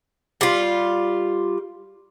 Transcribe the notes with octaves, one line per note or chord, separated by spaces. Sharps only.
G3 F4